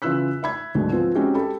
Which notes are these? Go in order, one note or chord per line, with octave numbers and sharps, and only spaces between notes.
C#3 E3 F4 E6 F#6 B6
E5 B5 G#6
D2 G#2 B2 D3 F#3 G#3
F3 B3 C4 F4
G#3 C4 C#4 D#4 F#4 G4
G4 A4 B5